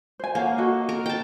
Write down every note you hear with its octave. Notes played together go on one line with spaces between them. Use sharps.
C5 G#5
A#3 C#5 F5 F#5
F#4 A4 D#5
A#4
G5 A5